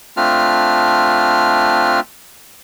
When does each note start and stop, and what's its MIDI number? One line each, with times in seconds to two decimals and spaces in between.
0.17 2.00 57
0.17 2.00 60
0.17 2.00 62
0.17 2.00 65
0.17 2.00 89